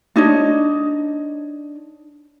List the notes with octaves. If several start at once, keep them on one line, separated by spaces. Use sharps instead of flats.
D4 D#4 C#5 D#5